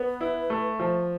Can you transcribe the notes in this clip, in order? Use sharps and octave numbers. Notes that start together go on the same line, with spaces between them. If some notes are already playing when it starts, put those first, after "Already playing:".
Already playing: B3 B4
E4
A3
F3